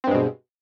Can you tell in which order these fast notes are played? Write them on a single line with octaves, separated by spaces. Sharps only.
C4 G2 G#3 B2